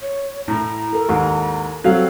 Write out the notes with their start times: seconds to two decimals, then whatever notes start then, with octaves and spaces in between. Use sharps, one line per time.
0.02 C#5
0.48 A2 E4 A#5
0.93 A4 A#4
1.08 D#2 G#2
1.84 F#3 G3 C4 A4 F5